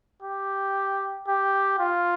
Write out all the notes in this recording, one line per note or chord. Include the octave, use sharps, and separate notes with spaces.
G4
G4
F4